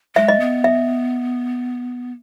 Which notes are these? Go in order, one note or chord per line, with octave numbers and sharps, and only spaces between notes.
G#3 E5
D#5
B3
E5